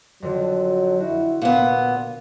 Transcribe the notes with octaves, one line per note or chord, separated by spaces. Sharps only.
F2 D3 F#3
E4 F#4
A#2 A#3 B3